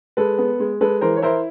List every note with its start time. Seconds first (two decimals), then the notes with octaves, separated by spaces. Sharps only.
0.17 G#3 A4 B4
0.38 B3
0.60 G#3
0.81 G#3 A4 B4
1.01 E3 A#4 C5
1.16 C#5
1.22 E4 A#4 C5